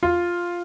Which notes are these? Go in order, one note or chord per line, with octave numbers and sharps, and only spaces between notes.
F4